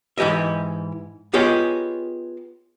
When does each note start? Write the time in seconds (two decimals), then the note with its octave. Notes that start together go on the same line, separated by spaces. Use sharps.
0.18 G#2 E3 G4 D#5 E5
1.33 B3 F4 G4 G#4 C#5 D#5